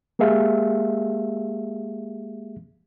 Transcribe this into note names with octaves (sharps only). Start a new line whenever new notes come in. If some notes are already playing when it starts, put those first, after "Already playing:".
G#3 A#3 G4 G#4 E5 F5